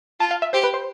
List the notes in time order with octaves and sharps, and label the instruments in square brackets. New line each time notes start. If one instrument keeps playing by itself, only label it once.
[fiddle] F4 [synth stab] A5
[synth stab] F5
E5
[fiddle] G4 [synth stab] C5
[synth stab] B4
C5